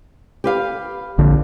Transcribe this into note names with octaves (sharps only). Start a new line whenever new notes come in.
G4 B4 F5
A#1 D3